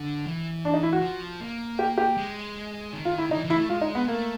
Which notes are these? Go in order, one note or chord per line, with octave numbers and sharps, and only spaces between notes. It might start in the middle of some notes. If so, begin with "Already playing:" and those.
Already playing: D3
E3
D4
D#4
E4
F#4
F3
A#3
G4
G4
G#3
D#3
F4
E4
E3 D#4
E3
E4
A3
G#3 F4
D#4
B3
A3 A#3